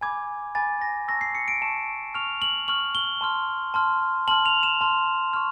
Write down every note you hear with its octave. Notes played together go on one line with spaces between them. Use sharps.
G#5 B5 D6 G#6
G#5 B5 D6 A6
A#6
A5 C#6 E6 A#6
C7
C#7
D7
A5 C#6 E6 E7
C#6 F6 F7
F#7
C#6 F6 F#7
G7
A5 C6 F6
A5 C6 F6
A5 C6 F6 F#7
F7
E7
A5 C6 F6
C#6 F6